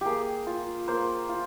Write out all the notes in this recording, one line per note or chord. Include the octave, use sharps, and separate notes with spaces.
A#3 G4 G#4
F4
A#3 C5
F4